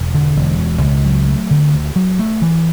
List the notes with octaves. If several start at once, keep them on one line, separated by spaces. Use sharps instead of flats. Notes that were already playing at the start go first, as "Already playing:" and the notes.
Already playing: E1
D3
E1
B2
C#2
F#3
A3
D3
D2
F#3
A3
E3